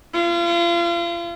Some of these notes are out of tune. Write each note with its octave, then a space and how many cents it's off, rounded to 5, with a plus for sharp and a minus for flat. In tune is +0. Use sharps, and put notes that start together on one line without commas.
F4 -35